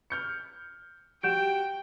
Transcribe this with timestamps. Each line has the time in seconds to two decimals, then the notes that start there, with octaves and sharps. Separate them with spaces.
0.10 F6 G6 C#7
1.23 F#4 G4 F#5 G5 G6 D7 E7